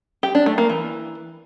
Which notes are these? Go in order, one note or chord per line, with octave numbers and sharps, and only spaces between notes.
G4
D4
A3
A#3
E3